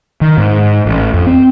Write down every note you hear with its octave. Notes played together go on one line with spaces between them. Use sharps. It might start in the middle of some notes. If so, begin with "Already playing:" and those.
D#3
G#2
A1
F2
C4